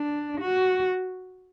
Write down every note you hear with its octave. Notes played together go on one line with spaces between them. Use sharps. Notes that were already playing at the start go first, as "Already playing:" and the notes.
Already playing: D4
F#4